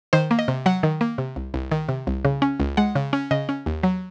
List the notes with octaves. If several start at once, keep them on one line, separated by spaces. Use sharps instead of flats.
D#3 C5
A#3
D#5
C3
F#3 F#5
D#3
A#3
C3
C2
C2
D#3
C3
C2
C#3
C#4
C#2
G#3 F#5
C#3
C#4
C#3 D#5
C#4
D#2
F#3